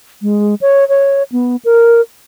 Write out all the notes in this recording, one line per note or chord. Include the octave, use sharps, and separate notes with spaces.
G#3
C#5
C#5
B3
A#4